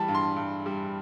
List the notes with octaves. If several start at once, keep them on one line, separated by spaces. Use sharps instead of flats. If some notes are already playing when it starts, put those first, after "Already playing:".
Already playing: E3 G3 A5 B5
G2
C6
G2
G3